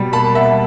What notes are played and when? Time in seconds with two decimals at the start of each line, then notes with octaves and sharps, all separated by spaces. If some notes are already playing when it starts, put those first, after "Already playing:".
Already playing: B2 G3
0.13 A#3 A5 B5
0.35 A#3 E5 F#5